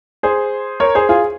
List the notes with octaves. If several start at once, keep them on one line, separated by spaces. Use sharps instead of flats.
G#4 C5
A#4 C#5
G#4 C5
F4 G#4